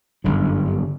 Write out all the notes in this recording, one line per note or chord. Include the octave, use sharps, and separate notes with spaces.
G1 F#2 D3